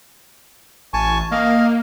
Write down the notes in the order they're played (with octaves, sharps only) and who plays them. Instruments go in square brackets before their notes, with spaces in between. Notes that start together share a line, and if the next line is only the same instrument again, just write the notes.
[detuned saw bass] A1 [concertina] G#5 A5 C#6
[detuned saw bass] A#3 [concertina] D#5 F5